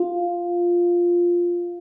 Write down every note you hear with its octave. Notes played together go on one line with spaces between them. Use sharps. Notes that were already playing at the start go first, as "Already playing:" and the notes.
Already playing: F4